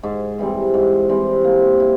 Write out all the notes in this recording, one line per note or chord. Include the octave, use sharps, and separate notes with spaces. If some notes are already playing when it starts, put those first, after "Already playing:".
G#2
E3 G3 C4
G#2
E3 G3 C4
A#3
E4